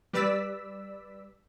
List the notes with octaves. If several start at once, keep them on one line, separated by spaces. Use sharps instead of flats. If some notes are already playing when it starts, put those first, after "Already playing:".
G3 B4 D5 E6 B6